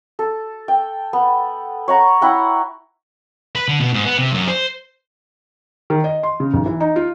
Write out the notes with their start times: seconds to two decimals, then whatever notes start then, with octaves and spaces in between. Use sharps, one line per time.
0.19 A4
0.68 G5
1.13 B3
1.88 C#5 F#5 A#5
2.21 E4 F#5 G5
3.55 B4
3.68 D3
3.80 B2
3.93 G#2
4.05 B3
4.18 C3
4.32 F#2
4.48 C5
5.90 D#3
6.04 D#5
6.23 C6
6.40 C#3
6.54 B1
6.66 E3
6.80 D#4
6.96 F4